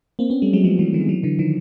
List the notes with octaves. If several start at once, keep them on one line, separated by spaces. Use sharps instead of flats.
A#3 C4
B3 C#4
G3 A3
F#3 G#3
F3 G3
E3 F#3
D#3 F3
E3 F#3
D3 E3
D#3 F3